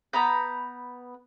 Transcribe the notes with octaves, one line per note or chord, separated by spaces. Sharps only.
B3 A#5 B5 G6